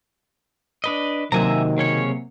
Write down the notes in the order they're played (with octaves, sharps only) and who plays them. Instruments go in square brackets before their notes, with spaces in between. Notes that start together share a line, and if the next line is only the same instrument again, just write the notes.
[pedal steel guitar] D4 B4 D#5
[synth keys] C3 F#3 A#3 [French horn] D#3 [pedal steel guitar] E5 G#5 A#5
[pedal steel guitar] C#3 C#4 C#5